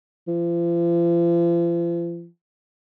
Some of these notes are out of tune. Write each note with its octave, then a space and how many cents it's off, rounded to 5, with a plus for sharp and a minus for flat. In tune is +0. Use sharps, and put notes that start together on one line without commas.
F3 -40